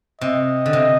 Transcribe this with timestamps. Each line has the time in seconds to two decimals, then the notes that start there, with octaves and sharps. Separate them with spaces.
0.21 C3 D#5
0.66 D3
0.73 C3